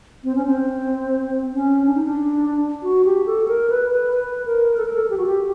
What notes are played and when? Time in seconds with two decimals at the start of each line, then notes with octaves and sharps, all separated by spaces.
0.24 C4
0.36 C#4
0.46 C4
1.53 C#4
1.86 D4
1.95 D#4
2.04 D4
2.83 F#4
3.05 G4
3.26 A4
3.48 A#4
3.70 B4
3.91 B4
4.13 B4
4.46 A#4
4.77 A4
4.85 A#4
4.93 A4
5.10 G4
5.18 F#4
5.26 G4